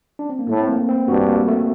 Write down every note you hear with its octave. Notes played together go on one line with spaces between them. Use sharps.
D4
C4
A#3
A2 A3
C4
A#3
C4
G2 F#4
A#3
A3